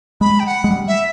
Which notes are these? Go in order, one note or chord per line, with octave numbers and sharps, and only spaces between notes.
G#3 B5
G5
F#5
G#3
G3
E5